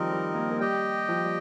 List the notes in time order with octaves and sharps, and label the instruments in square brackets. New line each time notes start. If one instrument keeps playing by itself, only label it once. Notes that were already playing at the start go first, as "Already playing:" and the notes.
Already playing: [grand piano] D#3 F3 G3 [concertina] C4 D#4 A#4 D#5
[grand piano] G3
A#3
A#3
[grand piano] G3 [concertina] G4 D#5 G5
[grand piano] F3
G3